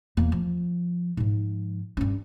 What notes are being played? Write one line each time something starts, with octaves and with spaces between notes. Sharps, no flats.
E2 A#3
F3
G#2 F3
G2 C#4